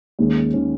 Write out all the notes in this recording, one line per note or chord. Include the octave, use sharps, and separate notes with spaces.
D#2 D#3 G#3 C#4
D#3 G#3 C#4